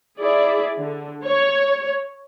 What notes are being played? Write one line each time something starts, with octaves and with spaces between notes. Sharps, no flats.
E4 G#4 D5
D3
C#5